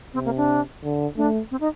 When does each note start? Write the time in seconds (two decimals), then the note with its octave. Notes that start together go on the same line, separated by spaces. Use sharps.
0.14 C3 C4
0.25 A#3
0.37 D4
0.83 D3
1.16 A3 D4
1.51 C4
1.60 D#4